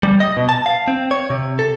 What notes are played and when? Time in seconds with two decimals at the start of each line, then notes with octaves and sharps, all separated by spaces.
0.03 G3
0.20 D#5
0.37 B2
0.49 A5
0.66 F5
0.88 C4
1.11 C#5
1.30 C3
1.59 A4